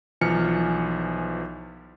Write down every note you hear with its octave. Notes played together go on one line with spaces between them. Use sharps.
B1 E3 F3 G#5 F6 C#7